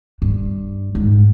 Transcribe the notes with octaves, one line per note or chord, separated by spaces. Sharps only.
G2
G#2